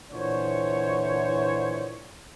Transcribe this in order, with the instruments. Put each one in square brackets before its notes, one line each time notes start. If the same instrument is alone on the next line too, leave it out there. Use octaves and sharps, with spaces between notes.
[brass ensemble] A#2 D3 E3 C5 C#5